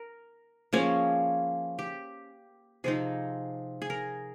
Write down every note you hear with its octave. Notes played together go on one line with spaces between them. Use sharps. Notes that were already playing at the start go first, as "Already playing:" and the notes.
Already playing: A#4
F3 A#3 C#4 G#4
G4
C3 F3 C4 D#4 G#4
G#4
A#4